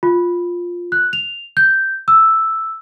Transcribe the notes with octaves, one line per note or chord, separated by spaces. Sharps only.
F4
F#6
F7
G6
E6